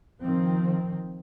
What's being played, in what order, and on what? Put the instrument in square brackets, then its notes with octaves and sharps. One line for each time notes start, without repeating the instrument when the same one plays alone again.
[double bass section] D#3 F3 C4